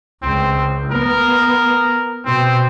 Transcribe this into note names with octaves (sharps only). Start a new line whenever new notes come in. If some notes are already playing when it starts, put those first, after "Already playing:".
C#2 C4
B3 A#4
B2 C4